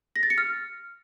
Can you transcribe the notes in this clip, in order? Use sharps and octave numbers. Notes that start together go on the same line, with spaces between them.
A#6
A6
C#7
F6